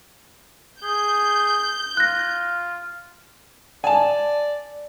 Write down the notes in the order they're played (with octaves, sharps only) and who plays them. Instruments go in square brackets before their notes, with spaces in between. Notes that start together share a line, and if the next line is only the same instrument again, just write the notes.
[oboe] G#4 [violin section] G6
[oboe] F4 [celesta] F#6 A#6
[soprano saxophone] D5 [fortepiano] G#5 A5